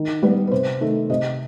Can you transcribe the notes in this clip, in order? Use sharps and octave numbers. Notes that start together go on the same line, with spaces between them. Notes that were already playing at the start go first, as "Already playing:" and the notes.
Already playing: D#3
G3 B3 B4
B4
C3 C5
D#3 A3
C3 D#5